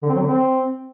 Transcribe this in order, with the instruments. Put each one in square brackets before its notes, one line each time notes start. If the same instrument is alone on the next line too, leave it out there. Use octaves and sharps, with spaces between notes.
[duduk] D3
C4
F#3
D3
C4